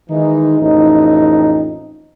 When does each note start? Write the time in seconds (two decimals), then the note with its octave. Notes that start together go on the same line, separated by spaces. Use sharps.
0.10 D#3 E3 G#3 D#4
0.61 A1 F2 D#4